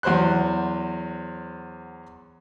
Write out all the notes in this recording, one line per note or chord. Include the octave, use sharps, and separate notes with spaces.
E2 F#3 C5 C6 F#6